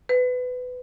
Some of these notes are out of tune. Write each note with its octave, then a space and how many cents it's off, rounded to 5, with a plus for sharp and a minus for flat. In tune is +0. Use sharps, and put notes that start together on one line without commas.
B4 +20